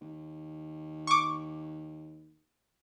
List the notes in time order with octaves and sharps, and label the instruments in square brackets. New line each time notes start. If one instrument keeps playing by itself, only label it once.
[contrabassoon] D#2
[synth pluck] C#6 D6